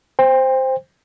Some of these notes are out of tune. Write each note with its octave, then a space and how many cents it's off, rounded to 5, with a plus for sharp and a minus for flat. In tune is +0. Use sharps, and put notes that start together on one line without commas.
C5 +0 G5 +30